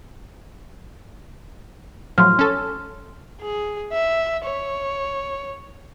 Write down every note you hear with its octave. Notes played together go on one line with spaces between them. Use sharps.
A2 F3 F#3 C6 F6
C#4 A4
G#4
E5
C#5